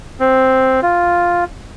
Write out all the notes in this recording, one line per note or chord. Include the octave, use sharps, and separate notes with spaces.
C4
F4